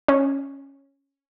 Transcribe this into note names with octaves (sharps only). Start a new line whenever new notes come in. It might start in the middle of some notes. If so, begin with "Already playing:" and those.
C#4